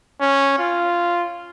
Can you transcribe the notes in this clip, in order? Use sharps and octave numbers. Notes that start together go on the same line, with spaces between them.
C#4
F4